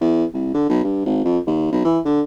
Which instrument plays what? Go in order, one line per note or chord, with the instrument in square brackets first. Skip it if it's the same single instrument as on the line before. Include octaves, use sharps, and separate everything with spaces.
[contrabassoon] E2
C2
D3
B1
G2
G#1
F2
D#2
B1
E3
D3